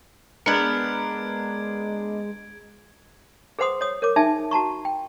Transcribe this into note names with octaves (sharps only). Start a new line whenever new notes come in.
G#3 B3 D4 A#4 G#6 C#7 D7
G#4 B4 C5 F#5 C6 D#6
C#5 D#6
A#4 C#5 D6
D#4 G#4 E5 G#5 A5
F#4 A5 A#5 C#6
G5